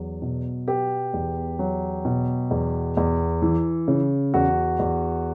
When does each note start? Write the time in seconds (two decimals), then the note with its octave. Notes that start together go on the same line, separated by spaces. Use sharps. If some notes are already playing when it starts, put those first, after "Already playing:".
Already playing: E2 F#3
0.22 B2
0.68 B3 G4
1.13 E2
1.59 F#3
2.05 B2
2.51 E2
2.97 E2
3.42 E3
3.88 C#3
4.34 E2 F#4
4.79 E2